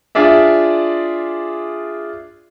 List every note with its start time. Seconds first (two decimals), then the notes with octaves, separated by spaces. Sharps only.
0.15 D4 F4 G#4 D5 E5